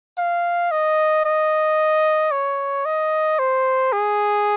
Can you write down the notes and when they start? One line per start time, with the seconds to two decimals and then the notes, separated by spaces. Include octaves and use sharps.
0.18 F5
0.71 D#5
1.25 D#5
2.32 C#5
2.85 D#5
3.39 C5
3.92 G#4